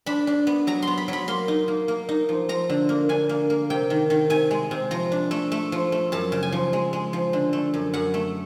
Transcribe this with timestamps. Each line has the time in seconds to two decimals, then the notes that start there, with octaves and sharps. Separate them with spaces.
0.06 D4 B5
0.27 D4
0.47 B3
0.67 F#3 A#5
0.82 C6
0.87 B3
0.98 B5
1.08 F#3 B5
1.28 A#3 C6
1.48 D#4
1.68 A#3
1.88 A#3
2.09 D#4
2.29 F3
2.49 F3 A#5
2.70 D3
2.89 A#3
3.09 D3 G#5
3.29 A#3
3.50 A#3
3.70 C3 G5
3.90 D#3
4.10 D#3
4.30 C3 G#5
4.51 G#3
4.71 C3
4.91 F3 A#5
5.12 D4
5.31 A3
5.52 A3
5.72 F3
5.92 A3
6.12 F#2 A5
6.32 C#3
6.43 G#5
6.52 F3
6.73 G#3
6.93 G#3
7.13 F3
7.33 D3
7.53 A3
7.74 F#2
7.94 F#2 F#5
8.14 A3